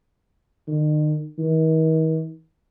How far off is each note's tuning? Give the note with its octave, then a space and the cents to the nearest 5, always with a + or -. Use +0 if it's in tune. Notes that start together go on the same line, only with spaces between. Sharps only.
D#3 -40
D#3 +45